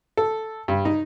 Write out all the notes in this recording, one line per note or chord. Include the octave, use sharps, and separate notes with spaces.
A4
G2
D#4